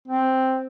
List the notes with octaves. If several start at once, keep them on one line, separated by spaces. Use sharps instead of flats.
C4